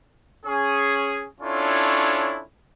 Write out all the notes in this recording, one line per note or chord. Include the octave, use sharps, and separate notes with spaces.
C#4 G#4
C#4 D4 E4 F4 A4 C#5